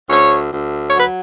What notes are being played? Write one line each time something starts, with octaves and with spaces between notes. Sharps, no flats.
D2 C#5
D2
C#5
F#3 B4